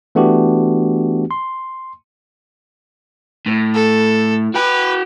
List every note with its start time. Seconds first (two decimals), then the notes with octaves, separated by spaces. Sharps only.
0.15 E3 A3 B3 D4 F#4 G4
1.31 C6
3.46 A2
3.75 A4
4.55 F#4 B4 G5